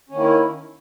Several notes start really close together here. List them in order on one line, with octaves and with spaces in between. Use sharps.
C#4 D#3 A#3 E4